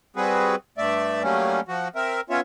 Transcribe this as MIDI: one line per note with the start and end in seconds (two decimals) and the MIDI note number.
0.16 0.55 55
0.16 0.55 60
0.16 0.55 66
0.16 0.55 68
0.16 0.55 71
0.78 1.23 43
0.78 1.23 57
0.78 1.23 74
0.78 1.23 76
1.23 1.60 54
1.23 1.60 55
1.23 1.60 57
1.23 1.60 58
1.23 1.60 61
1.68 1.88 53
1.68 1.88 66
1.95 2.21 60
1.95 2.21 70
1.95 2.21 76
2.30 2.41 59
2.30 2.41 61
2.30 2.41 65
2.30 2.41 73
2.30 2.41 76